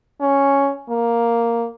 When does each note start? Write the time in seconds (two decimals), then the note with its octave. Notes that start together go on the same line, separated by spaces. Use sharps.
0.20 C#4
0.89 A#3